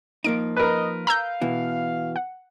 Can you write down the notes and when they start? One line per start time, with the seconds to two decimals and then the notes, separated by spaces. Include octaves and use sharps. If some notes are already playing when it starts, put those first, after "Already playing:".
0.24 F3 A#3 D#4 D7
0.56 A#4 B4 D#5
1.07 F5 A#5 E6 G6
1.41 B2 E3
2.16 F#5